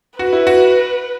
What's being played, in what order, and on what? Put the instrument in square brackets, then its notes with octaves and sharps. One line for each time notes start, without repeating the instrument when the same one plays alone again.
[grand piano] F#4 [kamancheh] B4
[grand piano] E4
F#4